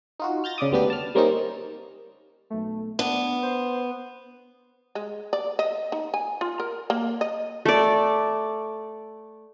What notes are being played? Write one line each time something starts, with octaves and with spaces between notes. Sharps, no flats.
D#4 F4 F#4
F6 G6 A6 A#6
C#3 D5 D6 D#6
D2 G3 B3 D4 G4
A5 F6
G3 A#3 C4 C#4 D#4
B1 A3
B3 D4
C5
G#3
D5
D#5
D#4
G#5
F4
A#4
A#3
D#5
A3 D5